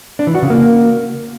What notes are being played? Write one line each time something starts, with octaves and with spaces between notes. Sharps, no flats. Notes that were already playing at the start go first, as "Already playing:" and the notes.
D4
E3
F#4
C#3
A#3